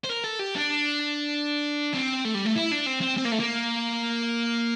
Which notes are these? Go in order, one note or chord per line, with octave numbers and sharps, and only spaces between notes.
C5
A#4
A4
G4
D4
C4
A3
G3
A3
E4
D4
C4
C4
C4
A#3
A3
A#3